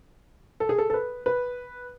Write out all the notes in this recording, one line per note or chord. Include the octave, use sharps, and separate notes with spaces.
A4
G#4
A4
A4
B4
B4